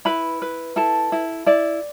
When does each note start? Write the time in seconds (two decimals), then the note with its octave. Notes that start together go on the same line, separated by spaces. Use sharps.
0.05 E4 B4 B5
0.42 B4
0.76 E4 A4 A5
1.12 E4
1.46 E4 D5